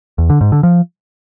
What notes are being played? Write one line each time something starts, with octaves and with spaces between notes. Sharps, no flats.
E2
D3
G#2
D3
F3